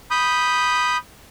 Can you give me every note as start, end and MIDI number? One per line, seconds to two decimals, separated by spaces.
0.11 0.97 83
0.11 0.97 87
0.11 0.97 91